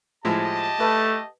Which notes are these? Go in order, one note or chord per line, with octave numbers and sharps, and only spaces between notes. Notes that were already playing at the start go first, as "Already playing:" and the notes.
A2 F3 G#3 G4 D#5 A5
A3 B4